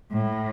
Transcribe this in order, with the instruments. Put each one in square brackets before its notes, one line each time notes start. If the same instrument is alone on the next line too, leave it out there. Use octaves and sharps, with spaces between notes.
[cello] A2